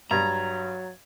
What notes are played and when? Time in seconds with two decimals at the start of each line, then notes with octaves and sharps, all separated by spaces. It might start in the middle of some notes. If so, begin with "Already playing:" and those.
0.11 G2 F#3 A#5 G#6 A6